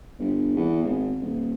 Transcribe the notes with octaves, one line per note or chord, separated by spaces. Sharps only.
G1
E2
G#1
D#1